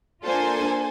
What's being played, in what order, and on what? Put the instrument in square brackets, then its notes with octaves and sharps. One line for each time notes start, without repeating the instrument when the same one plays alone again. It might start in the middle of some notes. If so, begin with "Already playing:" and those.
[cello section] A#3 D4 F4 [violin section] A4 C5 G#5